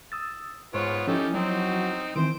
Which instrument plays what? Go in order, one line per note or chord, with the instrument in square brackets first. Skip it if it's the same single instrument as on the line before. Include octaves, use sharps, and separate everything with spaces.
[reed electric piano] D#6 E6 A6
[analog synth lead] G#2 [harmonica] B3 F4 C#5 [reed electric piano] C5
[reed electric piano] F3 E4 [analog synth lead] C#4 [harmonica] D#4 G4 A4
[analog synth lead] F#3 [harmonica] C4 D#4
[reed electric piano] D#3 E3 C4 [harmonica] C5 [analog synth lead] D7